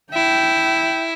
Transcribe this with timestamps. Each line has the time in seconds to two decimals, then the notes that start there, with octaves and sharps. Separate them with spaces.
0.13 E4 G5